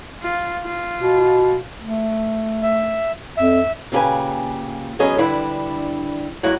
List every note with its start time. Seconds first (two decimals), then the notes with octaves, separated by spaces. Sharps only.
0.22 F4
0.65 F4
0.98 B2
1.81 A3
2.62 E5
3.37 F2 E5
3.92 A#2 C#3 D4 G4 B4 G#5
4.99 F#3 B3 C#4 G#4 D#5
5.18 D3 G3 D4 E4 B4
6.43 E2 F#3 G#3 E4 F#5